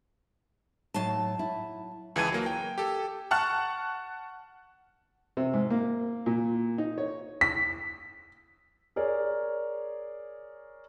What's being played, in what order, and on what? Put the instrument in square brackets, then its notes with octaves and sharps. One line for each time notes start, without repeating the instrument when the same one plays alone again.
[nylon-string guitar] A2 D#4 [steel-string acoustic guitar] F#3 A5
[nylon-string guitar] E4
[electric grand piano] C#2 E3 G#4 A5 G#6 D#7
F#3 A#3
G5
G4 A4
[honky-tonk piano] F#5 A5 C#6 F6 F#6
[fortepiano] C3
G#2
A#3
A#2
D#4
C#5
[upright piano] B6
[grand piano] G#4 A#4 C#5 D5